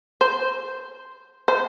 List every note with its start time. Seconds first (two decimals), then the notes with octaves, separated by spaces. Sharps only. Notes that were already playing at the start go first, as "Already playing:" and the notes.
0.21 C5
1.48 C5